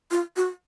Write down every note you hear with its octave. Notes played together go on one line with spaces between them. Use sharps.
F4
F#4